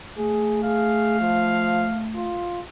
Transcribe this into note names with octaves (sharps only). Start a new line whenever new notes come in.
A3 G#4
G#4 F5
F3
F4